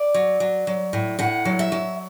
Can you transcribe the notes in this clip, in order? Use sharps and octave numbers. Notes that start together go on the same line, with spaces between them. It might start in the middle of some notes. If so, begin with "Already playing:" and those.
Already playing: D5
F#3
F#3
F#3
A2
A2 F#5
F#3
E5
F#3